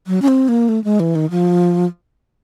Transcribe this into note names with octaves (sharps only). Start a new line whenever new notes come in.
F#3
C#4
C4
A#3
A3
G#3
E3
D#3
F3